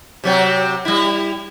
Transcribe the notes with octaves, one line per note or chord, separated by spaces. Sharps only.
C3 F#3 C4
G3 E4